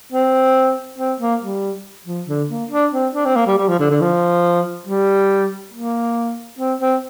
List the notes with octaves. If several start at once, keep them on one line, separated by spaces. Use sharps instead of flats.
C4
C4
A#3
G3
F3
D3
A#3
D4
C4
D4
C4
A#3
G3
G3
F3
D3
D3
F3
G3
A#3
C4
C4